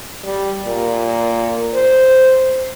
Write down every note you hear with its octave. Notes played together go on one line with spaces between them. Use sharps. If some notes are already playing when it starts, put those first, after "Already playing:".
G3
A#2
C5